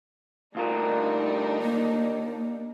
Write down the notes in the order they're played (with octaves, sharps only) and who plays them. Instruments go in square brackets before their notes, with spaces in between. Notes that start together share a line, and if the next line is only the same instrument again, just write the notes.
[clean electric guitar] D2 F4 A#4 [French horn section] G3 A3 [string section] D4 D#4
[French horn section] D#2 D#3 D#5 [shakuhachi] A#3